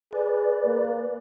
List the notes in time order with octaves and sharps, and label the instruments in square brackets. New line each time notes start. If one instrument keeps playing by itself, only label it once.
[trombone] G#4 [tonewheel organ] B4 D5
[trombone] A#3